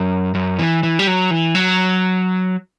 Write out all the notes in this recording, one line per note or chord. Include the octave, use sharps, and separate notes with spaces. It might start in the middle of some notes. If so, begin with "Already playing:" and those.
Already playing: F#2
F#2
E3
E3
G3
F#3
E3
F#3